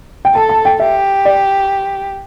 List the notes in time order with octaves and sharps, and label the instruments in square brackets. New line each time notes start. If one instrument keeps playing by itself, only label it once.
[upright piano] G5
[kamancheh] A4 [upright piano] A5
[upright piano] A5
G5
[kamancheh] G4 [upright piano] E5
[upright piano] D5